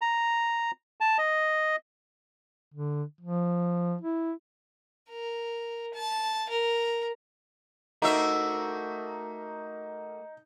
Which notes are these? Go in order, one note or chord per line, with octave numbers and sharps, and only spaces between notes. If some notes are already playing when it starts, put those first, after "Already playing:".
A#5
A5
D#5
D3
F3
E4
A#4
A5
A#4
A3 A#3 D#4 F#4 E5